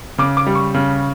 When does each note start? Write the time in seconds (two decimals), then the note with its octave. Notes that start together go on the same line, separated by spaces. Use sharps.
0.18 C#3 D6
0.37 D6
0.46 G3
0.55 C#6
0.74 C#3